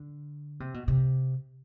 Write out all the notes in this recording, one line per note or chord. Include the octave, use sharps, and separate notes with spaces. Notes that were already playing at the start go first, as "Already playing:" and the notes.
Already playing: D3
C3
B2
C3